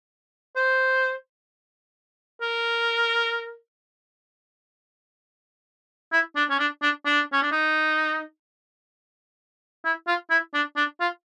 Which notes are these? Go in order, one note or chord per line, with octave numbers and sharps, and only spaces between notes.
C5
A#4
E4
D4
C#4
D4
D4
D4
C#4
D4
D#4
E4
F4
E4
D4
D4
F4